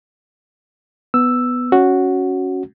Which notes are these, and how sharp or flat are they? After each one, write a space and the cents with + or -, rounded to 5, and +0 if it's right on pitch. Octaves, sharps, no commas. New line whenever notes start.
B3 +10 E6 +0
C#4 +0 F#4 +0